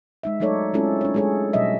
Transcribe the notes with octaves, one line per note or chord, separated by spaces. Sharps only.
G#3 D#4 E5
F#3 A3 D#4 A4 C#5 D5
G#3 C4 C#4 E4 F4 A4
D4 C#5
G#3 A3 G#4 A4 C#5
B2 F#3 G3 D#5 E5